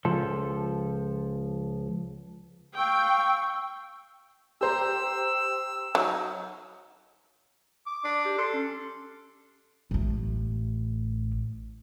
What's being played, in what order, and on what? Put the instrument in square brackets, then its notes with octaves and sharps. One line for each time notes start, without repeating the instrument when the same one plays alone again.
[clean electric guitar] C#2 F3 A4
[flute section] F5 C#6 E6 [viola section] G5
[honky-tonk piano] G4 C5 A#5 [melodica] E6
[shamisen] F#3 [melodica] D#4
[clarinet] D6
[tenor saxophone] D4
[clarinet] G4
[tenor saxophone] A4 [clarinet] C6
[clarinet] C#4
[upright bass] A1 A2